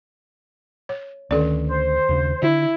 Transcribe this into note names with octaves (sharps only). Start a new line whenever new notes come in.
C#5
D2 D#3 C#4 A4 D5
C5
D#2 C#3
D3 E4